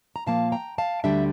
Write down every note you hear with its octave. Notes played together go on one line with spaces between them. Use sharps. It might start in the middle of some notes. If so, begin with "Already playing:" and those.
A#5
A#2 F3 A#3 F5 A5
G5 A#5
F5 A5
D2 D3 G3 D4 E5 G5